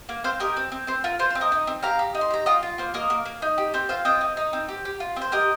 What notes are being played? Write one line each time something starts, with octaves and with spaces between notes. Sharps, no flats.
A#3
C4 C5 F5
G4 A#4 D#5
C4
C4
C4 C5
F4 A#4
F4 C5
C5
C4
A#4 D#5
D#4
C4
G4 F5 A#5
G4
D#4
C6
G4 A#5
F4 D#5 G5
F4
A#3 C5
A#3 A#4 D#5
A#3
A#3
D#4
G4
C4 C5
F4 C5 F5
C4 D#5 G5
D#4
D#4
C4
G4
G4
F4
C4
C5
G4 A#4 D#5